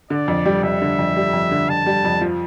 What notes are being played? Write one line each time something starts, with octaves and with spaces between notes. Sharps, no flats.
D3 D5
F2
G3
F2 E5
D3
F2
G3
F2
D3
F2 A5
G3
F2
F3